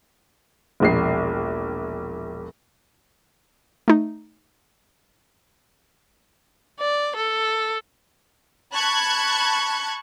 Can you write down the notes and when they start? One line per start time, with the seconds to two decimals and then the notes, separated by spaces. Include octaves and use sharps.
0.80 E1 A#1 C7
3.88 A3 D#4
6.79 D5
7.16 A4
8.74 A5 B5 C#6 F#6 G#6